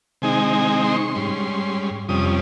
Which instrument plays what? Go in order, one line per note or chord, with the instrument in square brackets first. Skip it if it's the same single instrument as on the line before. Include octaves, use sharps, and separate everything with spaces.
[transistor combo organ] C3 D#3 G#3 C4 D#4 G#5
G#5
C6
C#6
C6
G#2 G3 C#4
F2 C3 G3 C#4 D#6